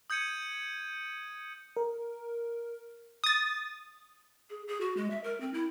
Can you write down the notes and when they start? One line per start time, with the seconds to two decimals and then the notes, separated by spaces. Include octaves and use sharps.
0.10 D#6 G6 G#6 C#7 D#7
1.76 A#4
3.24 D#6 A6
4.50 G#4
4.68 G#4
4.81 F#4
4.97 G#3
5.10 E5
5.24 A#4
5.40 C4
5.53 E4